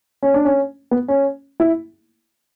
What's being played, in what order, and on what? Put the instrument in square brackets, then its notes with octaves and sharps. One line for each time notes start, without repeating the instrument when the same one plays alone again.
[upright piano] C#4
D4
C#4
B3
C#4
E4